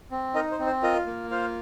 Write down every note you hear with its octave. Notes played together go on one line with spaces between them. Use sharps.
C4
D#4 A#4 D#5
C5
C4
C5
F4 A#4 D#5
A#3
F4 C5 F5